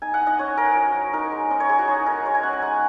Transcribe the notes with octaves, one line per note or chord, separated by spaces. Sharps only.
D#4 G#5
F#5
D#4
D#5
C#4 C#5
C#4 A#4
F#3
F#3
D#4 A#4
G#3
C#4 D#5
C#5
G#3 G#4
F#4
D#4 G#4
D#4 A#4
G#3 C#5
G#5
C#4 F#5
G#5
G#3 F#5